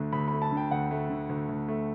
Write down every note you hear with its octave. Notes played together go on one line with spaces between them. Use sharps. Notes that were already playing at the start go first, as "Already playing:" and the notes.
Already playing: D2 D3 A3
D2 B5
B5
A3
A5
D3
G5
D2 F#5
A3
D3
D2
D2
A3